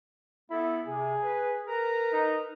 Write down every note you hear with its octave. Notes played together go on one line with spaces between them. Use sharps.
B3 E4 A4 B5
C3 G#4
B4
A#4 B4 A#5
D#4